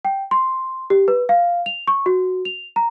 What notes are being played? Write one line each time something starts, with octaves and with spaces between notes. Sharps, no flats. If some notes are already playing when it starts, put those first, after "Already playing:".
G5
C6
G4
B4
F5
F7
C#6
F#4
F7
A#5